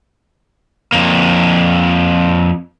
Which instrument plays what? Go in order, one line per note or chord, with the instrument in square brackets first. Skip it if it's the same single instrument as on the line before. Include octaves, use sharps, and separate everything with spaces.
[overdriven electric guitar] F2 A#3